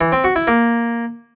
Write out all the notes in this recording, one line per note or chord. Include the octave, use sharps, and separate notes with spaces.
E3
C4
F#4
E4
A#3